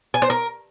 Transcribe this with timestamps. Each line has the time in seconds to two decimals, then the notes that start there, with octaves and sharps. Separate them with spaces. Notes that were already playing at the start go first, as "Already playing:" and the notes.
0.14 G#5
0.22 C5
0.30 A#4